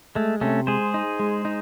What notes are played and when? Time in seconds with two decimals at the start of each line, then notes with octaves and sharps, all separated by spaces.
0.15 G#3 A3
0.41 C3 A3 C#4
0.67 G#3 G#4 C5
0.94 D#4
1.19 G#3
1.45 D#4